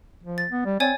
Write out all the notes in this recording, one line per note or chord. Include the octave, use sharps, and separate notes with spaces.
F3
A6
B3
G3
C4 C#5 D5 G#5